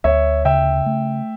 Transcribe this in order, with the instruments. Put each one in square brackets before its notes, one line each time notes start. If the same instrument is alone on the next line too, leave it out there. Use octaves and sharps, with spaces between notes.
[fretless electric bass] D2 [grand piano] C#5 E5
[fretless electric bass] C#3 [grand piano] E5 G5
[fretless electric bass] A3